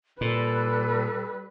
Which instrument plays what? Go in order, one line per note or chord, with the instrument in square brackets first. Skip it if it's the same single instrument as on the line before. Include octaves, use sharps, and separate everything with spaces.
[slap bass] A#2 [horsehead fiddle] G3 B4 [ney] A4